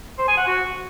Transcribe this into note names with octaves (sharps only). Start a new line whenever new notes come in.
C5
G#5
F#5
F#4